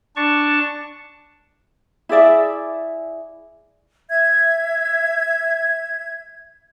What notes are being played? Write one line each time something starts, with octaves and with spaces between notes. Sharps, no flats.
D4 A5 C#6
E4 G#4 D5 E5
E5 G#6